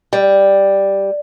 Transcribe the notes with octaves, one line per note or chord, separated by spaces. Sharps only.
G3